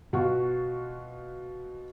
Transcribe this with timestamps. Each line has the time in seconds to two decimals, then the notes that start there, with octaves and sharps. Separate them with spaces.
0.13 B2 F4 F#4